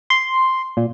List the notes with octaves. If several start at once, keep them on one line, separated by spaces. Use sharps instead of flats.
C6
A#2